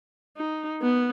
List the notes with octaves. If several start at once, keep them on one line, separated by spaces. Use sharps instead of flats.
D#4
B3